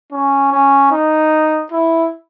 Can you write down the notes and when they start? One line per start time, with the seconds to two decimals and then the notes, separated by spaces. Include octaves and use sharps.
0.12 C#4
0.52 C#4
0.91 D#4
1.72 E4